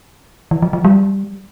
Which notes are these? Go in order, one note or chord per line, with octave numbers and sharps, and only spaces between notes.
E3
F3
F3
G3